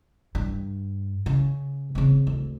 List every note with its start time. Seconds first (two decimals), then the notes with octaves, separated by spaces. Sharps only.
0.35 G2
1.26 C#3
1.95 C#3 C4
2.27 D2